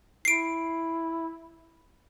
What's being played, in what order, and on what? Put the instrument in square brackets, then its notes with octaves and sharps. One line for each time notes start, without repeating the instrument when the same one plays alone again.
[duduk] E4 [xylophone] C7 D7